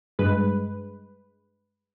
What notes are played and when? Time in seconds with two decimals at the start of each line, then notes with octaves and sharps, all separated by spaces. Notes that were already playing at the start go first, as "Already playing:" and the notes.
0.19 G2 G#3 B4